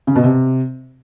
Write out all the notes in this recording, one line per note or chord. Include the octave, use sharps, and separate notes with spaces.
C#3
B2
C3